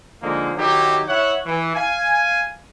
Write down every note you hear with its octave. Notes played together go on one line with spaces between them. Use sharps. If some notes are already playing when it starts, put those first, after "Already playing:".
D3 F3 G#3 A#3 D#4
D#3 F#3 D#4 E4 G4
E4 C#5 E5 F#5
E3
F5 G#5